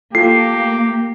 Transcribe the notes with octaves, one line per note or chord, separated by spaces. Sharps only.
A#3 F4 G4 A4 C7